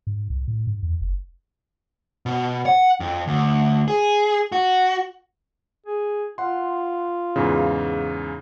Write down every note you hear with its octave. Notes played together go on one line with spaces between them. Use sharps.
G#2
C2
A2
G#2
E2
F#1
B2
F#5
F2
D2
G#4
F#4
G#4
F4 F#5 C6
E2 G#2 C#3